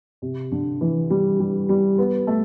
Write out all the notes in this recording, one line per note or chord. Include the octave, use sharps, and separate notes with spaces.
C3
D3
E3
G3
G3
G3
B3
A3